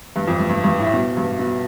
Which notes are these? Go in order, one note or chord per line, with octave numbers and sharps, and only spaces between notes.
G2
F2
G2
G2
G2
A2
B2
G2
B2